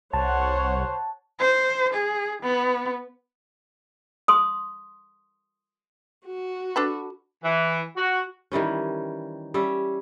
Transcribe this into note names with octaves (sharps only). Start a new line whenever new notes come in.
C2 C5 C#5 F#5 A5
C5
G#4
B3
C6 D#6
F#4
D4 A4 B4
E3
F#4
D#3 E3 G3 C#4
G3 C#4 E5